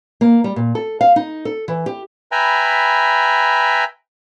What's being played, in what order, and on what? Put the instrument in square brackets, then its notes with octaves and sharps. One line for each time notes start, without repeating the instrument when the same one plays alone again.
[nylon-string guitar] A#3
G3
A#2
A4
F5
D#4
A4
E3
G4
[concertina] B4 E5 G5 G#5 A#5 B5